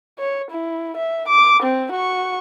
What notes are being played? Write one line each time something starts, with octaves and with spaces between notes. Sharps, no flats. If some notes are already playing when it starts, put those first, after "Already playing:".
C#5
E4
E5
D6
C4
F#4 C#6